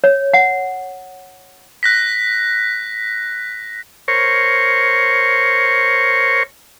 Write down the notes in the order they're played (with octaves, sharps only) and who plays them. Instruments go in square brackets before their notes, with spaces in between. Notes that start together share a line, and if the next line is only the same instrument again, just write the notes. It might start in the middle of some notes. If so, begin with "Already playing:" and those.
[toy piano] C#5
F#5
[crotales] F#6 A#6 B6
[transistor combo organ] A#4 C5 C#5 C#6